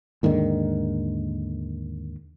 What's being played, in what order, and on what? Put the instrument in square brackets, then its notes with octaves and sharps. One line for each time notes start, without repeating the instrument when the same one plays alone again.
[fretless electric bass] D#2 G#2 D3 D#3